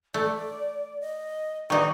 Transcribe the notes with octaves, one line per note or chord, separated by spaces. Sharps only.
A3 D5
D#5
D#3 D#4 B4 D5 C#6